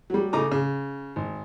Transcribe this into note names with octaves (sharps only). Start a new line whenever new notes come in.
F#3 G3
C#3 A3 D#4 A#5 D6
C#3
G#1